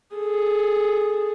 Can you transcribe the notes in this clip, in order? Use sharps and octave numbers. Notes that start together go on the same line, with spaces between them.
G#4 A4